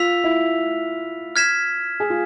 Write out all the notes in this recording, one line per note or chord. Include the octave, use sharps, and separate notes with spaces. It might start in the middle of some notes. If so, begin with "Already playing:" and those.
Already playing: F4 E6 B6 F7
E4
F6 G#6 B6 E7
G#4
F4